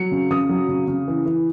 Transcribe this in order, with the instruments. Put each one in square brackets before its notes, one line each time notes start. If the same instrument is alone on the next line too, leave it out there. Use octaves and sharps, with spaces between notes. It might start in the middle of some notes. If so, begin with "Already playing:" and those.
Already playing: [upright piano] F#3 C#7
C#3
C#3 D#6
F#3
C#3
C#3
E3
E3